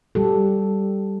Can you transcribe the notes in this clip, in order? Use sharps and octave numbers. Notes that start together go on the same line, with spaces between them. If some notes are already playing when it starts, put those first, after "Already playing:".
G3 G4 A4